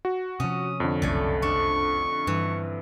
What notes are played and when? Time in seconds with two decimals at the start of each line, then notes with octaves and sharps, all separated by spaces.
0.05 F#4
0.40 C3 F3 C#4 D#6
0.80 F2 D3
1.02 F#1 C2 F#2 A3 D5 G#5
1.42 D4 C#6
2.27 G2 E3